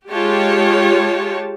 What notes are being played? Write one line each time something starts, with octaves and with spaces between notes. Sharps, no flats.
G#3 F4 G4 C#5 A5